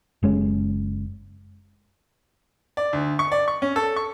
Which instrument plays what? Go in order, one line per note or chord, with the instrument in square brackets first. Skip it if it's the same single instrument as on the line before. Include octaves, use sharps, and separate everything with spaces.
[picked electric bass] F#1 G#3 C#4
[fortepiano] D5
D2
C#6
D5
C#6
C#4
A4
C#6